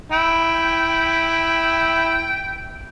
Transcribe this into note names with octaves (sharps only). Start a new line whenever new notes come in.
E4 G5